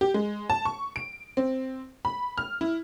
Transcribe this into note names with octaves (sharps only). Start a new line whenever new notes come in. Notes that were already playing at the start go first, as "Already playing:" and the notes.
G4
G#3
A5
C#6
D7
C4
B5
F6
E4